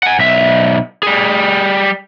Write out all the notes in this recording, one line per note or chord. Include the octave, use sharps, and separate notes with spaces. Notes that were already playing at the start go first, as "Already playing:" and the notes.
F#5 G#5
B1 E5
G3 G#4